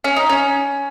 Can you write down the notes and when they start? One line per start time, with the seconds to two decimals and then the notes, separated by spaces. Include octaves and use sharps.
0.04 C#4
0.16 D#4
0.29 C#4